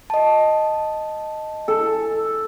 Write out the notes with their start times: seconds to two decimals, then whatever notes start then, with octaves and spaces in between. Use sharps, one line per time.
0.10 D#5 A5
1.68 A4